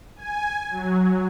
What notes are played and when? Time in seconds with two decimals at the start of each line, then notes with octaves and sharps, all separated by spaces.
0.16 G#5
0.71 F#3